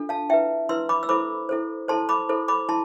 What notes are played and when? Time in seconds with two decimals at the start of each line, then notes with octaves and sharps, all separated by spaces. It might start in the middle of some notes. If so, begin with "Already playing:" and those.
Already playing: D4 F4 A4
0.09 F5 A5
0.29 E4 B4 E5 G5
0.69 E4 B4 C6 E6
0.89 B5 D6
1.03 E6
1.09 E4 A4 C5 B5 D6
1.49 E4 A4 C5
1.88 E4 A4 C5 A5 C6
2.09 B5 D6
2.29 E4 A4 C5
2.48 B5 D6
2.69 E4 A5 C6